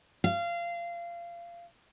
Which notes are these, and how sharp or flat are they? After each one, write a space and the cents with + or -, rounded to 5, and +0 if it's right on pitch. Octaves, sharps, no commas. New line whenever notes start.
F5 -25